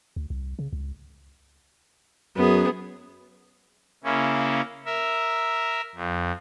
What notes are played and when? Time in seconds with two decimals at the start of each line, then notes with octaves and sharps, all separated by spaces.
0.16 D2
0.30 C2
0.59 C#3
0.73 C#2
2.36 F#2 B3 G#4
4.04 C#3 A#3 C#4 E4
4.85 A#4 E5
5.95 F2